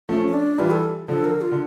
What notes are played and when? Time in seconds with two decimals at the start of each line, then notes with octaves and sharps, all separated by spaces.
0.09 F3 A3 C#4
0.27 C#4
0.33 D4
0.58 E3 G3 F4
0.71 A4
1.08 D3 F3 A4
1.25 A#4
1.41 F4
1.52 D3